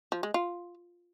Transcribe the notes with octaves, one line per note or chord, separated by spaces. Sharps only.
F3
G#3
F4